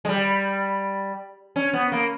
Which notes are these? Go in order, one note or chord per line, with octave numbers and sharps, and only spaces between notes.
G#3
G3
C#4
B3
A#3